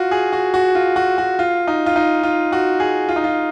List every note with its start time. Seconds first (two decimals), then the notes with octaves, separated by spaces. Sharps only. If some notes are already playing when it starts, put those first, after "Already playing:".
Already playing: F4 F#4
0.11 G#4
0.33 F#4
0.54 F#4
0.75 F4
0.96 F#4
1.18 F#4
1.39 F4
1.67 D#4
1.86 F4
1.96 D#4
2.23 F4
2.52 F#4
2.80 G#4
3.09 F4
3.16 D#4
3.24 F4